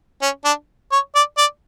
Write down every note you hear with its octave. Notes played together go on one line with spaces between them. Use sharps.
C#4
D4
C#5
D5
D5